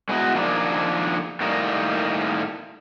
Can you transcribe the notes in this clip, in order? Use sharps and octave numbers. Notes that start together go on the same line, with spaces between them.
G#3 B3 E4 F#4
D#3 F3 A#3 D4 G#4
A2 D#3 G3 A#3